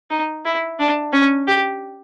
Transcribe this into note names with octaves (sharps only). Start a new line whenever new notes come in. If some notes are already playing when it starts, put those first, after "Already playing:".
D#4
E4
D4
C#4
G4